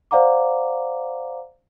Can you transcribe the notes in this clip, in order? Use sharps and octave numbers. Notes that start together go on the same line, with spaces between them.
C5 D5 F5 F#5 A#5 D6